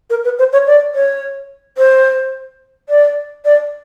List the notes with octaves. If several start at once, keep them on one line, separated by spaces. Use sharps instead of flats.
A#4
B4
C5
C#5
D5
C#5
C5
D5
D5